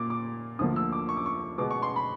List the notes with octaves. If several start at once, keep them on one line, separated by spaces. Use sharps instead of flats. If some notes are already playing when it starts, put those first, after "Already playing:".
Already playing: A#2 A#3 D6
D6
D2 D3 F3 A#3 D#6
E6
D6
C#6
D6
C#6
B2 G#3 B3 D6
C#6
C6
B5